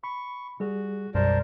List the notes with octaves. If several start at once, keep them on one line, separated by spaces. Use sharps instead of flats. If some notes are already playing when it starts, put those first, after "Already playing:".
B5 C#6
G3 F#4 G#4
B1 F#2 B2 G3 A#4 C5 D5 A5